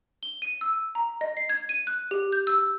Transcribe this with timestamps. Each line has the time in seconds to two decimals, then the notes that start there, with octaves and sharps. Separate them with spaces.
0.23 G7
0.42 D#7
0.61 E6
0.95 A#5
1.21 D#5
1.37 C7
1.49 G#6
1.69 D#7
1.87 F#6
2.11 G4
2.32 G6
2.47 E6